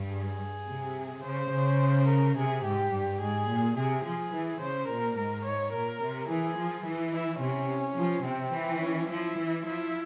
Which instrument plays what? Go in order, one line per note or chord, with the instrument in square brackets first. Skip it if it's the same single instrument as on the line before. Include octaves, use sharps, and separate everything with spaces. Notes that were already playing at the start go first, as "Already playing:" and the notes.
Already playing: [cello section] G2
[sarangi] G#4
[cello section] C3
[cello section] C#3 [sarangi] C5
[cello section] C#3
[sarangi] A#4
[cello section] C3 [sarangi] G#4
[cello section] G#2 [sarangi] G4
[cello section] G2
[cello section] G#2 [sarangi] G#4
[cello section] A#2
[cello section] C3 [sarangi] G#4
[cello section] F3 [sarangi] G#4
[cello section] E3
[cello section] C#3 [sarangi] C5
[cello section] A#2 [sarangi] A#4
[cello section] G#2 [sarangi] A#4
[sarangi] C#5
[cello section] A#2 [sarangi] A#4
[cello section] C3
[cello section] E3 [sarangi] G#4
[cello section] F3
E3
[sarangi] E4
[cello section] C3 [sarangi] C#4
[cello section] F3
[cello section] C3 [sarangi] C4
[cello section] E3
[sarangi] C#4
[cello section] F3 [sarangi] E4
[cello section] E3
[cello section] F3 [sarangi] E4